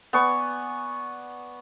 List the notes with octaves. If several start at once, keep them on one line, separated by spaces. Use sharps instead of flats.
B3 D5 G#5 C#6